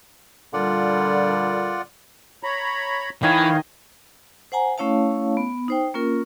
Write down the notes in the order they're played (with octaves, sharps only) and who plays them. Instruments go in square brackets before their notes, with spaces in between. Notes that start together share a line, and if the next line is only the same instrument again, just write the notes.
[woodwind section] A#2 D3 G3 [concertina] F4 D5 F#5
[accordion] C#5 A#5 B5
[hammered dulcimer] D#3 D#5 G#5 [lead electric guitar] E3 [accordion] D#4 C#5 F5
[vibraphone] C5 F#5 G#5 A#5
A3 C#4 E4 C#5 F5 A5
B3
D#4 C5 G5
A#3 C#4 F4 A#4